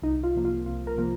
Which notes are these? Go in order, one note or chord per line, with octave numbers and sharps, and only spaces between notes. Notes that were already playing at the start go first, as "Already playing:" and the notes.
C2 D#4
F4
C3 F3 A#3
F4
C2 F4
A#4
C3 F3 A#3